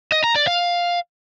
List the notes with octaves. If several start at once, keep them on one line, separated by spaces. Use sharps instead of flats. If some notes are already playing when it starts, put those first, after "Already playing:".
D#5
A#5
D5
F5